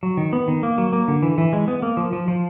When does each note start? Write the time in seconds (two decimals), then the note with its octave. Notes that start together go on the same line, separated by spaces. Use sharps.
0.03 F#3
0.17 D#3
0.33 B3
0.48 D#3
0.63 A#3
0.78 F#3
0.93 A#3
1.08 D3
1.23 E3
1.38 E3
1.53 G#3
1.68 B3
1.82 A#3
1.97 F3
2.13 F3
2.28 F3